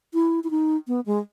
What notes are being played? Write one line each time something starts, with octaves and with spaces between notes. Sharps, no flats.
E4
E4
D#4
B3
G#3